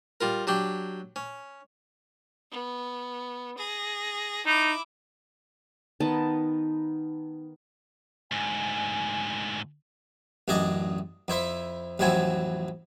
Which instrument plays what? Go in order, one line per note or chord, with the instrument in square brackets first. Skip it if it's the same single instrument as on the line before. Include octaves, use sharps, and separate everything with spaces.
[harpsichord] G3 F4 A#4
F#3 D4 G4 G5
C#4
[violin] B3
G#4 A#6
[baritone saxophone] D#4 [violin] E4 D6
[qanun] D#3 B3 D#4 A5
[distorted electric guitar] D2 G#2 [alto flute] G#5
[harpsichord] A1 F#2 D4 G#4 D5 D#5
F2 E4 C5 E5
A1 F2 F#3 C4 E4 G#5